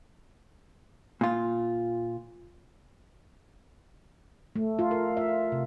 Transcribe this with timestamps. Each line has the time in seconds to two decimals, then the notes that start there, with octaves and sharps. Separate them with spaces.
1.21 A#2 F4
4.56 A3
4.79 F4
4.91 A#4
5.17 E5
5.52 C3